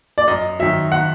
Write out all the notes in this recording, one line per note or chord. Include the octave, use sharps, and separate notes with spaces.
D5
F#2 D#5
D#3 F#3 E5
F#5